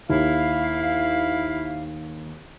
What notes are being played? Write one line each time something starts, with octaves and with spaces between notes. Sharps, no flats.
D#2 E4 F5